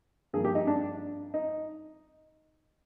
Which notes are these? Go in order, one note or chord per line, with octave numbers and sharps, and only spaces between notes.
G2 F3 A#3 G#4
G4
D#4
D4
D#4